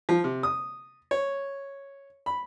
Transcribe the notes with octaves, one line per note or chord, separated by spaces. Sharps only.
F3
C3
D#6
C#5
B5